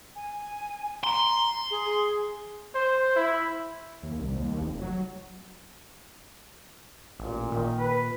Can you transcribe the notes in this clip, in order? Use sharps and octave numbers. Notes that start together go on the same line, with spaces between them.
G#5
A#5 C6
G#4
C5
E4
D#2
C2
D#2
F1
F#3
A1 A#2
A#2 D#3
B4